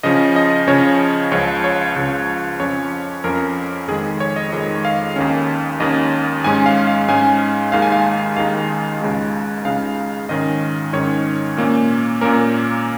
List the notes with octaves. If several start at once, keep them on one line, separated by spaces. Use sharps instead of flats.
C#3 F3 C#4 D#5
D#5
C#3 F3 C#4 C#5
C#2 C#3 F3 C#5
C#5
C#2 C#3 F3
F2 F3 C#4 C#5
F2 F3 C#4 A#4
F2 D#3 G#3 G#4
C#5
D#5
F2 D#3 G#3 D#5
F5
D#2 D#3 C#4
D#2 D#3 C#4 D#5
G#2 G#3 C#4 G#5
F5
F5
G#2 G#3 C#4 G#5
D#2 D#3 G#3 D#4 F5
G#5
F5
D#2 D#3 G#3 D#4 F5
C#2 C#3 G#3 D#4
C#2 C#3 G#3 D#4 F5
G#2 D#3 C#4 D#5
G#2 D#3 C#4 C#5
A#2 A#3 C#4
A#2 A#3 C#4 A#4